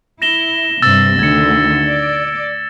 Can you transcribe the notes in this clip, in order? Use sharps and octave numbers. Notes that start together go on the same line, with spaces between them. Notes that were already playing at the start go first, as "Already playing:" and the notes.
E4 A#6 E7 G7
G2 C3 E6 A6 E7
D2 D3 D#3 G#6 C#7
D5